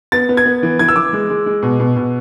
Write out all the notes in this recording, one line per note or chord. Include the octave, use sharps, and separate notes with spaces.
B3 A6
B3
G#6
B3
E3
E3 G#6
E6
E3 D6
G#3
G#3
G#3
B2
B2
B2